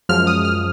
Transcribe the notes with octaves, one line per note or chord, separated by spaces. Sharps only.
F#2 F3 G#3 F6
D#6
F6